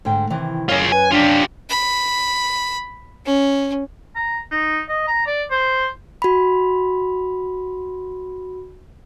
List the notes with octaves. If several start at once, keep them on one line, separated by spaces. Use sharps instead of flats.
G#2 D3 G5
C3 D#3 E3
F#2 F4 G#4 C#5
B4 G#5
D4 F4 G4
B5
C#4
A#5
D#4
D#5
A#5
D5
C5
F#4 B5